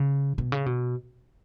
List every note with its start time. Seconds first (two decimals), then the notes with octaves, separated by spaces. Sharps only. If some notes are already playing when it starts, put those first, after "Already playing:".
Already playing: C#3
0.38 B2
0.52 C#3
0.66 B2